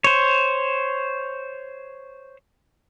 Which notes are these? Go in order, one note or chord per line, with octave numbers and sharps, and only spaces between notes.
C5 C#5